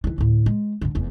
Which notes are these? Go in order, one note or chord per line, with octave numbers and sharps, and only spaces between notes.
D#3 E3
D2 A2
G#3
G#2 D3
F1 E2